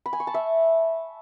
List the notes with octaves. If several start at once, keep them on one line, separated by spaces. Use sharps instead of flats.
B5
G#5
C#6
A5
E5